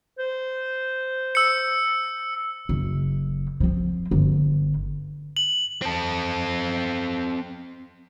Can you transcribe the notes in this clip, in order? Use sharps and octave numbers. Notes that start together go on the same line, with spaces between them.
C5
E6 C#7
F#1
F3 C4
G1
F#7
C4 A4